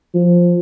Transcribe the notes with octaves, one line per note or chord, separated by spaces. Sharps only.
F3